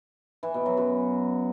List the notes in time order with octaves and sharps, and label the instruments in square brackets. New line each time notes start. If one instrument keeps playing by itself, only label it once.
[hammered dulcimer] E3
B2
F#3
F#2